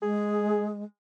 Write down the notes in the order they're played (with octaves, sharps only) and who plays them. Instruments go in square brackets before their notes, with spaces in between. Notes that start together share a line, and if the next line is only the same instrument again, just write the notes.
[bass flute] G#3 [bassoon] G#4